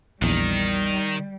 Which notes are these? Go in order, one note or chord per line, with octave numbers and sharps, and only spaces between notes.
A#1 E2 D#3 G3